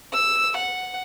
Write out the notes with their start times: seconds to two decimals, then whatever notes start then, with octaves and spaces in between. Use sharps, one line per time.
0.13 E6
0.57 F#5